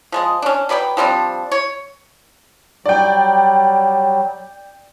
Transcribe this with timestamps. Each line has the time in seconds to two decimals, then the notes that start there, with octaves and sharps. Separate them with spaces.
0.12 F3 G#3 D#5
0.42 C#4 D4
0.69 F#3 B4 D5 G5
0.97 F3 G3 C4 D4
1.52 C#5
2.86 F#3 G3 D5 G5